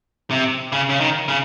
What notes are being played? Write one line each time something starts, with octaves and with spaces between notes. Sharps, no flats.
C3
C#3
C#3
D#3
C#3